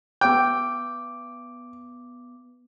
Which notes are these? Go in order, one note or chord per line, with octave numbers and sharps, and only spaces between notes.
B3 G5 D6